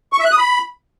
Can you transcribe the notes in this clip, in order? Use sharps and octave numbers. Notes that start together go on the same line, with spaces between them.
C#6
E5
F#6
D#6
B5